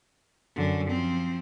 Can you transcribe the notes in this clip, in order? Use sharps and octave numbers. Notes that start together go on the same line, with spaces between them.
F#2 D3
F3 C4